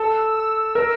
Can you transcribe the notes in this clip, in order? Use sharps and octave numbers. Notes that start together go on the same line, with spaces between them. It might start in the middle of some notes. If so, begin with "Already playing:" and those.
Already playing: A4 E6
E6
A#4